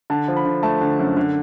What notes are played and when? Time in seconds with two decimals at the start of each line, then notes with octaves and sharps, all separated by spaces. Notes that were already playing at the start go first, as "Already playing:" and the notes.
0.10 D3 A5
0.28 F3
0.37 B5
0.46 D3
0.63 A3 A5
0.81 D3
0.99 F#2
1.17 D3